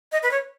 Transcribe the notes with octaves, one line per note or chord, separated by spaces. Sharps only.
D#5
B4
C#5